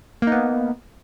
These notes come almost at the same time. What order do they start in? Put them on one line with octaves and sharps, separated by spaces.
A#3 D#4 B3